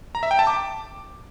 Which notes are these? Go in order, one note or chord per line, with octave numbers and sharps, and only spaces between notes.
A#5
E5
G5
A5
D6